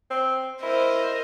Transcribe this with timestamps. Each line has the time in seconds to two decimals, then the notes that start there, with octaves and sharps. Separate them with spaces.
0.11 C4
0.62 E4 A#4 C5 D#5